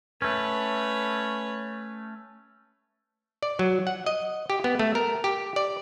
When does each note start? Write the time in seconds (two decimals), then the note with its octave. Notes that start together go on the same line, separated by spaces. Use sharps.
0.22 A3 C#4 B4 C#5
3.43 D5
3.59 F#3
3.87 F#5
4.07 D#5
4.50 G4
4.64 B3
4.79 A3
4.95 A#4
5.24 G4
5.56 D5